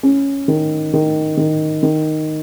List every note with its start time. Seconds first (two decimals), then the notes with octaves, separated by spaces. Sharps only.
0.03 C#4
0.48 D#3
0.93 D#3
1.37 D#3
1.83 D#3